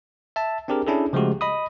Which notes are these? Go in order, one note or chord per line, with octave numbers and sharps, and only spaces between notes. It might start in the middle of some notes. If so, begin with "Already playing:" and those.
E5 A5
C4 D4 G4 G#4 A#4
C#4 D4 E4 G#4 A4
C#3 F3 G#3 A3 F#4 G4
D#5 B5 D#6